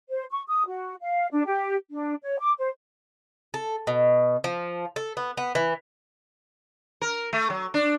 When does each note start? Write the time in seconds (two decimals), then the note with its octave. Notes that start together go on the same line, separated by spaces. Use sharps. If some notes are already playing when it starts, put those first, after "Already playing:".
0.09 C5
0.31 C#6
0.47 D#6
0.68 F#4
1.02 F5
1.32 D4
1.46 G4
1.91 D4
2.23 C#5
2.39 D6
2.59 C5
3.54 A4
3.87 B2
4.44 F3
4.96 A4
5.17 B3
5.37 B3
5.55 E3
7.01 A#4
7.33 A3
7.50 F#3
7.74 D4